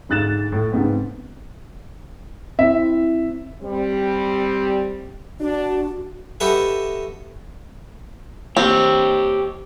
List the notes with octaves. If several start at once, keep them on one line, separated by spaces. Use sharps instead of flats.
D2 G#2 F#6 A6 E7
A2
G#2 C#3 B3 C4
C4 E4 E5
G3 C4
D4 F#4
F#4 G4 A4 B4 D#5 E5
C4 G4 C#5